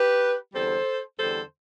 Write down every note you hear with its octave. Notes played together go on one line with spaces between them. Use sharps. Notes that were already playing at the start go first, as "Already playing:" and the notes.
Already playing: G4 B4
E2 D3 G3 C4 A4 C5
E2 D3 G3 C4 A4 C5